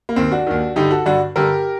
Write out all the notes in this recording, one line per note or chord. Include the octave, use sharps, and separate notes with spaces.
A#3
D#2 D#3 C4
D4 F#4
D#2 D#3
G2 D3 D#4 G4
F#4 A4
G2 D3 D4 F#4
G2 D3 G4 A#4